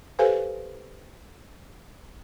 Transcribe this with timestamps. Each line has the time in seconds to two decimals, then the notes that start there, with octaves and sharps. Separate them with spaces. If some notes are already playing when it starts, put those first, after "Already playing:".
0.19 G4 A4 B4 C5 F5 G#5